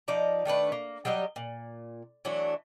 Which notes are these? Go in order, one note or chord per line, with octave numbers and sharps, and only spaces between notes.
F3 D#4 D5 A#5
D#3 A3 D4 B4
A#3
F#3 G3 G4 D#5
A#2
E3 F#3 A3 D4